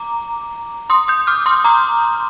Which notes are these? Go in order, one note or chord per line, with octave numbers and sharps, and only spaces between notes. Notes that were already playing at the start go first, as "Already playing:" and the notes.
Already playing: A#5 D6
C6 D#6
D#6 G6
D6 F6
C6 D#6
A#5 D6